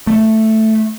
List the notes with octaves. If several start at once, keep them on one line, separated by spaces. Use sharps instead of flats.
A3